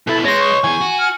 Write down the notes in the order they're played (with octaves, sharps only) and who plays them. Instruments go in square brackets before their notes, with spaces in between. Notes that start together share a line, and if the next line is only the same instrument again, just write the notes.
[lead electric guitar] B2 E4 [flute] A4
[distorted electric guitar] G#3 [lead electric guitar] C#5 C6 [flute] A#6
[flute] C#6
[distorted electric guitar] E3 G#4 [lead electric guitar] G#5
[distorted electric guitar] F#4
[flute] F6